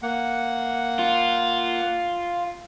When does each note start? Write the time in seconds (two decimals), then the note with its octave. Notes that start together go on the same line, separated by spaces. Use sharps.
0.02 A#3 F#5
0.99 F4